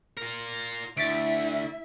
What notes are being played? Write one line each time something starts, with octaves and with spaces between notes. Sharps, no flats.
F4 A#4
D2 E4 E5 A6 B6 D7